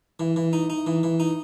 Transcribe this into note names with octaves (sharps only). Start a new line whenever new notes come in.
E3
E3
D#4
D#4
E3
E3
D#4